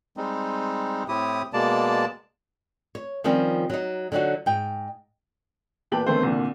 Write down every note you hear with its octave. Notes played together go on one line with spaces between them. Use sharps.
G3 G#3 C4 D#4
A2 C4 E4 G4 D#6
B2 G#3 A#3 D5 A5
C#5
D#3 F3 G3 C4 C#4
F#3 D#4
D3 F#3 D#4 F#4
G#2 G5
E2 A#2 G4 B4 A5 F#7
D3 D#3 A3 B3 C4 C5
C2 A#2 D3